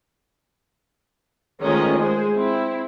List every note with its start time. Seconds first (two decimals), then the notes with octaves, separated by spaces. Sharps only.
1.62 D#3 F3 G#3 A3 C#4 D#5
1.99 G#3 G#4 C5
2.36 C4 E4